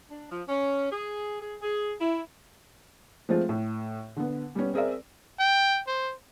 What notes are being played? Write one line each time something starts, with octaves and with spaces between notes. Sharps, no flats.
D4
F3
C#4
G#4
G#4
G#4
E4
F3 G#3 A3 C4 F4
A2
D3 B3
G3 B3 C#4
C4 G#4 A#4 D5 E5
G5
C5